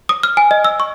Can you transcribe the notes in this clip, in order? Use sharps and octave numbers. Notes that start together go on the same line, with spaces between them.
D#6
F6
G#5
D#5
E6
C#6